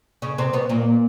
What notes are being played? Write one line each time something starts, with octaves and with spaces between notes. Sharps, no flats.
C#3 C#4
C3 C4
B2 B3
A#2 A#3